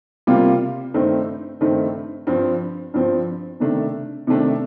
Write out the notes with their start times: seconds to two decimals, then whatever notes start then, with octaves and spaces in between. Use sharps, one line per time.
0.27 C3 G3 A#3 F4
0.94 G2 D#3 A3 C4 D#4
1.61 G2 D#3 A3 C4 D#4
2.27 G2 F3 C4
2.94 G2 F3 C4
3.60 C3 D#3 A3 D4
4.27 C3 D#3 A3 D4